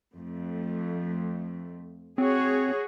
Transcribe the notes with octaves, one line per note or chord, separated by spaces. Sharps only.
F2 A3
C4 F#4 G#4 C#5